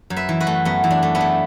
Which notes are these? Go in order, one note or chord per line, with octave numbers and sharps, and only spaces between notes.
F#2
B4 E5
E3
F#4 B4
A3
F#2 B3
E3
D4
A3
B3 E4
A3